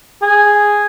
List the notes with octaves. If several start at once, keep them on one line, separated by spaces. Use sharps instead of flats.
G#4